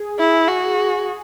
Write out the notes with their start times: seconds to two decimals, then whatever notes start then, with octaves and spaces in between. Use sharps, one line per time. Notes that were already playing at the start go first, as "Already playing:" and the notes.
Already playing: G#4
0.19 E4
0.47 F#4